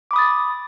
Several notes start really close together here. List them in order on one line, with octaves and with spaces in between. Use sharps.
D6 B5 D#6 A6